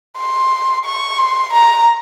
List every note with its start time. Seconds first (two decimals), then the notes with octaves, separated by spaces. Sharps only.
0.17 C6
0.85 C#6
1.18 C6
1.53 A#5